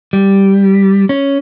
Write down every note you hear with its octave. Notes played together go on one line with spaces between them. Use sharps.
G3
C#4